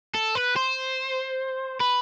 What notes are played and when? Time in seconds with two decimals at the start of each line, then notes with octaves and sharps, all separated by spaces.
0.15 A4
0.35 B4
0.56 C5
1.81 B4